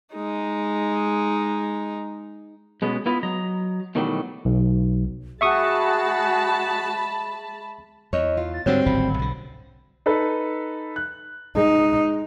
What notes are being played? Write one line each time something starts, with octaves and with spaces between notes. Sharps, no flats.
G#3 D#4
B2 G#3 B3 C#4
B3 E4 F4 B4 D#5
F#3 D#5 A#5
B2 D#3 E3 F#3 G3 A3
B1
G#3 F#4 G#4 E5 A5 B5 C#6 D#6
E2 C#5 D#5
F4
A6
G#2 D3 G3 C4 F#4 C#5
D1 G#1 C#3 B5
B1 D3
D#4 A4 B4
F#6
G#3 D#4